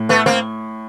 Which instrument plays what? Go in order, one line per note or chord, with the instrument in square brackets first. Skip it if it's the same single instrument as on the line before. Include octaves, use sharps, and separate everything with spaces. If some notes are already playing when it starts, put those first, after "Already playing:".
Already playing: [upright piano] A2
[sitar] A3 B3
A#3 C4